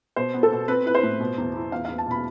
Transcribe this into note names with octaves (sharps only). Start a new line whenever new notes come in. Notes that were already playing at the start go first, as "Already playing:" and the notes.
B2 C5
B3
A4
B2
C4 B4
E4 B4
C5
A2
B2
E2
E4
E2 F5
E2 F5
A5
B2 B5